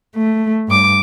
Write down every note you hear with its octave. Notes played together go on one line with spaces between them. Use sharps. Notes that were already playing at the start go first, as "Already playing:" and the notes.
A3
G2 D6